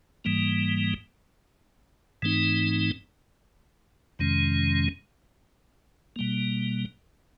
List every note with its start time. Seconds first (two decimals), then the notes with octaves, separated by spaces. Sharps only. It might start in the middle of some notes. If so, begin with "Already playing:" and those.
0.25 G#2 E3 G3 A#3
2.22 G#2 E3 A3 C4 D#4
4.19 F2 C3 D#3 G#3 C#4
6.16 B2 G3 A#3